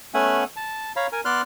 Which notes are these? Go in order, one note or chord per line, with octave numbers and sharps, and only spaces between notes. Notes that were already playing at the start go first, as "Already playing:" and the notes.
A3 B3 C#4 E5 F#5 G#5
A5
C#5 F5 A#5 B5
A#4 G#5
B3 D5 C6 F6 F#6